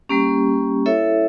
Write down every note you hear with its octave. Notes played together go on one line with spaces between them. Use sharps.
G3 A#3 C#4 G4
E4 A4 C#5 E5